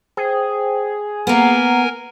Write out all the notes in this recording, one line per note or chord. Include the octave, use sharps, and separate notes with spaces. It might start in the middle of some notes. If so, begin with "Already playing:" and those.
G#4 C5 G5
A#3 B3 A#4 F#5 G#5 A#5